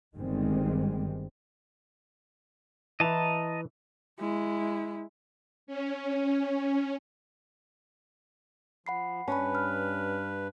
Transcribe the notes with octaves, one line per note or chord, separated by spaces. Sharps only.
G1 D#3 G3 G#3 C4
E3 E4 D#5 A5 A#5
G#3 E4
C#4
F3 F#5 B5 C7
G2 C#4 B4 A5 B5
F6